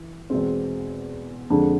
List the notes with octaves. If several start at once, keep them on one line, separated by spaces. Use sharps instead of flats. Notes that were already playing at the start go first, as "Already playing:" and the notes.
Already playing: E3
E2 B2 G#3 C4
F2 D3 G#3 D4 G#4